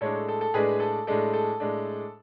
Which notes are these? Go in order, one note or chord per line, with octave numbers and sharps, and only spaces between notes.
A2 G#3 D4 A4 C#5
A4
A4
A4
A2 G#3 D4 G#4 B4
A4
A2 G#3 D4 A4
A4
A2 G#3 D4